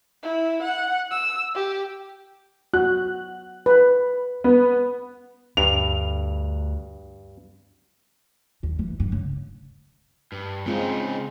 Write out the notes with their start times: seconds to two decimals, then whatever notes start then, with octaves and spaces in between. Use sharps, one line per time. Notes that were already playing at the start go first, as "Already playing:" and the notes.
0.23 E4
0.62 F#5
1.11 E6
1.55 G4
2.74 F#4 F#6
3.66 B4
4.44 B3
5.57 D2 G2 D4 F7
8.63 D#2
8.79 E3
9.00 G2
9.12 C#3
10.32 G2
10.66 C#3 G#3 C4 D#4 F4